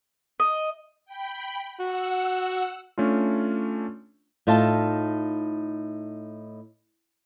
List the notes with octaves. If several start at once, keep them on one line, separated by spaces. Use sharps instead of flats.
D#5
G5 B5
F#4 F#5 E6
A3 C#4 D4 F4
A2 D#4 F4 E5 A5